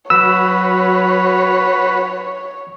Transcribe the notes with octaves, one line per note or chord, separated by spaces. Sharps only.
F#3 F#4 B4 C#5 E6